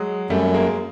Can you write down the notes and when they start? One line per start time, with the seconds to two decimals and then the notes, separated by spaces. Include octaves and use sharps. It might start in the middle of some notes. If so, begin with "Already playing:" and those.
Already playing: F#3 G#3
0.30 F#2 G3 A3
0.46 A3
0.54 G#3 A#3